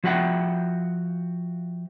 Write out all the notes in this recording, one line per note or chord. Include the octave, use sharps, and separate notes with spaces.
F3 F#4 E5 F#5 G5